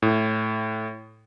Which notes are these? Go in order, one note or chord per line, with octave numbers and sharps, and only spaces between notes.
A2